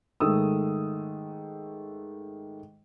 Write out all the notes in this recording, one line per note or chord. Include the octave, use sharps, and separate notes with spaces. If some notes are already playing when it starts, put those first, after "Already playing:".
G#2 D#3 A3 D#6 E6